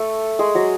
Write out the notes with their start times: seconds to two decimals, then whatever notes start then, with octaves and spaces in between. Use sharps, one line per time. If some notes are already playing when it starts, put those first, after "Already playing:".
Already playing: A3 A4
0.39 G#3 G#4
0.55 F#3 F#4